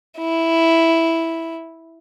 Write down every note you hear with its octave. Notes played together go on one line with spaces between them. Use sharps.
E4